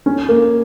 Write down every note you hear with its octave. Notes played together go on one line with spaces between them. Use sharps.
C#4
A#3